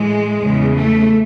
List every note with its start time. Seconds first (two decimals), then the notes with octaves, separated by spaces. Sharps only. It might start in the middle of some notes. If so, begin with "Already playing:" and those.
Already playing: A2 E3 G#3
0.40 E2 C#3 E3
0.77 A3